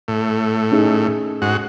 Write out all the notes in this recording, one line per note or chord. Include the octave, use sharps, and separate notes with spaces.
A2
C#4 D#4 G#4
G#2 F#4